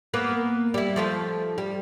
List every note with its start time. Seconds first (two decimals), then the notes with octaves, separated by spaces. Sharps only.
0.14 A#3 B3 B4
0.74 G3 E4
0.96 F3 A3 F4
1.58 G3